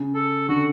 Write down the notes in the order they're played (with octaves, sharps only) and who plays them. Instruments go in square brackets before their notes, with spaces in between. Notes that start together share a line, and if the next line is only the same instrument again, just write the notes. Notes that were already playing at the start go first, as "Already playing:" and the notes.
Already playing: [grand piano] C#3
[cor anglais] A4
[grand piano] D3 [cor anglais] F#4